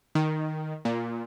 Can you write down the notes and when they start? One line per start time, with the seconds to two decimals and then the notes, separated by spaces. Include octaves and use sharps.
0.15 D#3
0.85 A#2